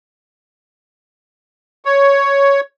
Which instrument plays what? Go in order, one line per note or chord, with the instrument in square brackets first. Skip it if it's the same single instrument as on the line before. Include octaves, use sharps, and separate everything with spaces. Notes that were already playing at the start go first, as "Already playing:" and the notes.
[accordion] C#5